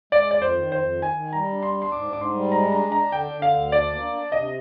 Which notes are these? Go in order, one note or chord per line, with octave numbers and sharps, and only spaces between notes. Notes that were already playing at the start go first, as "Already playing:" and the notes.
G#3 D5
F2 D5
C5
D#3
F2 C5
D#3
G#5
D#3
G3 A#5
D4
C6
D4
C6
G#2 D6
G#2 D6
C6
G3
G#3 A#5
D4 A#5
D4 A#5
D3 G5
D3
F5
D2
D4 D5
A#3
D4
C3 D#5